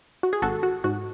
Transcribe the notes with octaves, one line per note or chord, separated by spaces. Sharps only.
F#4
G#4
G#1 F#4 A4
F#4
G#2 F#4